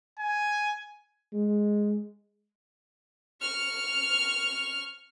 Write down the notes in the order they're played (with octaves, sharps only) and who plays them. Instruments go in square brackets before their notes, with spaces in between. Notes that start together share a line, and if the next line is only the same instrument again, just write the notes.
[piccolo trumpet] G#5
[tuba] G#3
[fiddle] C#6 F6